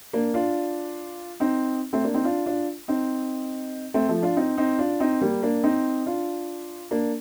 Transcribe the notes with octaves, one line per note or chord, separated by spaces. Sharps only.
A#3 D4
D4 F4
C4 D#4
A3 C4
A#3 D4
C4 D#4
D4 F4
D4 F4
C4 D#4
A3 C4
F3 A3
D4 F4
C4 D#4
C4 D#4
D4 F4
C4 D#4
G3 A#3
A#3 D4
C4 D#4
D4 F4
A#3 D4